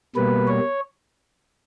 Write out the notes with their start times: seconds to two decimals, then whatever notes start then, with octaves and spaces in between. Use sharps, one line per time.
0.16 B2 G3 A#3 B4
0.47 C#5